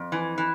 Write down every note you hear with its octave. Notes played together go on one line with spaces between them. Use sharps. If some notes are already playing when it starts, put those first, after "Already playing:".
Already playing: F2
E3
E3